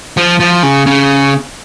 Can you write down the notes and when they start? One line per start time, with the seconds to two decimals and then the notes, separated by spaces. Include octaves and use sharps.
0.17 F3
0.40 F3
0.63 C#3
0.86 C#3